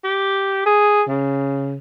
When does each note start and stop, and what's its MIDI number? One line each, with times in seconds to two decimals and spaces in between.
0.04 0.63 67
0.66 1.03 68
1.09 1.76 49